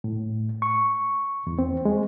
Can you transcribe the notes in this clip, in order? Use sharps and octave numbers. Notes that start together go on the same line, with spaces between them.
A2
C#6
E2
C4
G#3